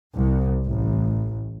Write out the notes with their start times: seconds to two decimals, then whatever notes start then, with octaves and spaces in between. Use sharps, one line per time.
0.14 C2
0.65 A1